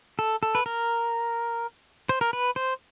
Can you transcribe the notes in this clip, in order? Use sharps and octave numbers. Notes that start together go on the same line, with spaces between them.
A4
A4
B4
A#4
C5
A#4
B4
C5